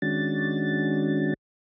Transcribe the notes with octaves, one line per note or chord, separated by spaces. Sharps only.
D#3 G#3 C#4 D4 F#4 A6